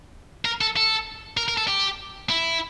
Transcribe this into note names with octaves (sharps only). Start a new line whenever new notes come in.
A#4
A4
A4
A#4
A#4
A4
G4
E4